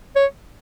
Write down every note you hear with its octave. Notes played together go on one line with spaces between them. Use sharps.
C#5